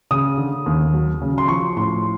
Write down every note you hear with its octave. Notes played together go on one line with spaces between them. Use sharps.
C#3 D#6
D3
D#2
F#3
C#3
C6
F3 C#6
A2 C6